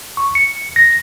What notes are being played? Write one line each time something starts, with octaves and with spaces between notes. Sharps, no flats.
C#6
C#7
A#6